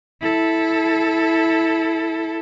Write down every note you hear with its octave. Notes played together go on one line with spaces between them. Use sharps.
E4 A4